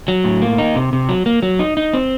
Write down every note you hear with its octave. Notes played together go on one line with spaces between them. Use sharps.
F#3
A2
A#3
D#4
C3
C3
F#3
A#3
F#3
D#4
D#4
C4